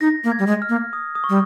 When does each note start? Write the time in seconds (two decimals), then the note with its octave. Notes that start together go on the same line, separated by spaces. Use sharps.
0.01 D#4 A#6
0.24 A#3
0.32 G#6
0.39 G3
0.47 G#3
0.62 F6
0.69 A#3
0.93 D#6
1.15 D#6
1.24 C#6
1.29 G3